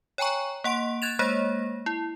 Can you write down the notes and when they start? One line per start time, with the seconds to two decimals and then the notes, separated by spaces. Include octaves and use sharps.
0.18 C#5 G5 G#5 A#5 C#6
0.64 A#3 F#5 C6 D7
1.02 F#6 G#6 A6 E7 F7
1.19 G#3 A#3 C5 C#5 A#6
1.86 E4